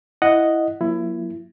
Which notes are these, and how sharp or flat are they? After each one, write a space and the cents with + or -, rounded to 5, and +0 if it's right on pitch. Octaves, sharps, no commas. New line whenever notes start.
E4 +0 D#5 +0 F#5 +0
F#3 -45 A#3 +20 E4 +20